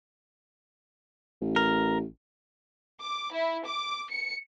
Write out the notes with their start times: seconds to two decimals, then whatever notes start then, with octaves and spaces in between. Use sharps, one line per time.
1.41 A1
1.56 A#4
3.01 D6
3.33 E4
3.66 D6
4.10 C#7